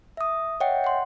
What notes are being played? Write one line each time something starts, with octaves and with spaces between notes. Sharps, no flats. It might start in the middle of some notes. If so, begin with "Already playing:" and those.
E5 D#6
C#5 D#5 E5 F#5 G5
F#5 C6